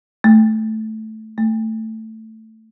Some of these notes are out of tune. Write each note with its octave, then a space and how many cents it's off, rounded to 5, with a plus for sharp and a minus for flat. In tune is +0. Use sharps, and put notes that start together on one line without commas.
A3 -5
A3 +10